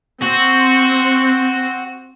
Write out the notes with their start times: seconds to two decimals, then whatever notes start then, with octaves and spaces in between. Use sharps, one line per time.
0.22 C4 F#4